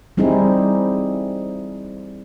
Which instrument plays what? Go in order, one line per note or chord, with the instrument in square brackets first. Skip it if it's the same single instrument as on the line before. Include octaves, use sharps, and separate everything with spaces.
[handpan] G3 C4 D#4 E4 G#4